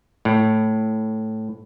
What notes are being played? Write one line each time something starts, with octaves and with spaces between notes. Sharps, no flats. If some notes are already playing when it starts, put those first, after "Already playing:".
A2